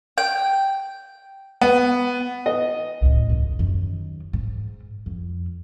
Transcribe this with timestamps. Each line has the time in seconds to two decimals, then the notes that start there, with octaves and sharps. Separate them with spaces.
0.18 G5
1.61 B3
2.46 D#5
3.02 C#2 A2
3.30 G#1 D#2
3.59 F#2 D#3
4.33 G#2
5.06 F2